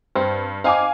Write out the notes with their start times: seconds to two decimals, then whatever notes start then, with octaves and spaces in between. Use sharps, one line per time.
0.16 G2 C4
0.64 C4 D#4 F5 G#5 D6